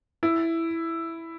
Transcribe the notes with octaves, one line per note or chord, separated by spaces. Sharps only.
E4